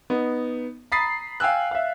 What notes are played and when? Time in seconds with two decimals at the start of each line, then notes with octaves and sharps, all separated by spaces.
0.10 B3 D#4
0.92 A#5 B5 D#6 A6 B6 C7
1.40 F5 G5 G#5 E6 F#6
1.71 E5 F5